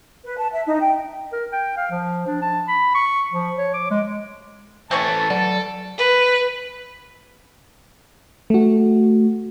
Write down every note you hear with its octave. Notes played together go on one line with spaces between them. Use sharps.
B4
A5
E5
D#4
G5
A#4
G5
F5
F3
D4
A5
B5
C#6
F3
C#5
D6
G#3
E3 A3 C4 C#4 C#5 A5
F#3 B3 A4 D5
B4
A3 F#4